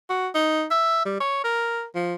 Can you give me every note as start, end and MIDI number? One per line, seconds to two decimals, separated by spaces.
0.09 0.28 66
0.35 0.64 63
0.71 1.02 76
1.05 1.18 55
1.20 1.40 73
1.44 1.84 70
1.95 2.15 53